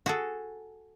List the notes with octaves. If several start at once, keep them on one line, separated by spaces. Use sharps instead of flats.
F#4 G#4 A4